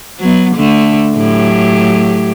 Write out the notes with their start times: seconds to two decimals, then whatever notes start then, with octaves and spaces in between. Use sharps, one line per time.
0.20 F#3 B3
0.56 D3 A3
1.17 A2 F#3 G4